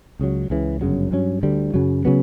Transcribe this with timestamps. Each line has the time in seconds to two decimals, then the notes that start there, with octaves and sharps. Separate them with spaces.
0.19 C#2 C#3 F#3
0.50 C#2 C#3 E3
0.81 G1 F#2 C#3 F#3
1.11 G2 F#3 C#4
1.43 D2 D3 G3
1.74 F#2 C#3 F#3
2.05 C#3 F#3 B3